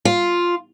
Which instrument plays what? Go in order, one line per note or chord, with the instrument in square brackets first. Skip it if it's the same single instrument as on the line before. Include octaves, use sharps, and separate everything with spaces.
[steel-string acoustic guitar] F4